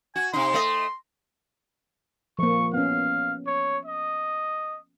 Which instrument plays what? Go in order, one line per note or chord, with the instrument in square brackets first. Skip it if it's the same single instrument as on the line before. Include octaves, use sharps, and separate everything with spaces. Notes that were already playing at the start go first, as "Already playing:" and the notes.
[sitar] F#4 [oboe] G#5
[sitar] C3 D#4 [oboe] C6
[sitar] A3 D#5
[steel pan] F3 A#3 [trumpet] C#6
[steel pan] B3 C#4 [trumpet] F5
[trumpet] C#5
D#5